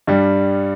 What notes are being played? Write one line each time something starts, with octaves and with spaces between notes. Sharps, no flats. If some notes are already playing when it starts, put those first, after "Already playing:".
G2 G3